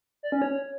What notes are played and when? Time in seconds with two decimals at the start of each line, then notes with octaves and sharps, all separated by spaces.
0.23 D5
0.32 C#4
0.42 C#5